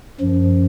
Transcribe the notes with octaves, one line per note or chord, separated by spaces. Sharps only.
F#2 F3